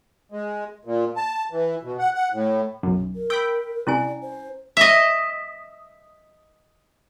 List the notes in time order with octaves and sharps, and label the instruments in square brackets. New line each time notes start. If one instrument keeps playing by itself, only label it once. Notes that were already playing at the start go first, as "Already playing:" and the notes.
[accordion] G#3
A#2
A5
E3
B2
F#5
F#5
A2
[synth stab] B1 F#2
[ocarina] A#4
[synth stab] G5 B5 [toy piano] E6
[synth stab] C2 [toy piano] C#4 E4 G#5 [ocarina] D5
[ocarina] C5
[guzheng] D#5 E5